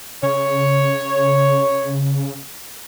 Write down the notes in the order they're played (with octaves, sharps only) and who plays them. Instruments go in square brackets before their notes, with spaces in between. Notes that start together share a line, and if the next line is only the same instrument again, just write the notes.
[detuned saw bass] C#3 [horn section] C#5